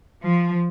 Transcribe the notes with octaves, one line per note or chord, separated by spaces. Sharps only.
F3